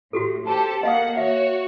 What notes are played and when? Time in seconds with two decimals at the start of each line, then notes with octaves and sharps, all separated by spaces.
0.13 A2 F#4 G4 A4
0.47 G4 A4 C5 A5
0.83 A#3 D#5 F5 F#5 D#6
1.17 F#4 C#5 E5